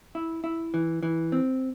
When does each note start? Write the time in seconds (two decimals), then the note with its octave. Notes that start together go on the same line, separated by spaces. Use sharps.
0.15 E4
0.44 E4
0.74 E3
1.03 E3
1.32 C4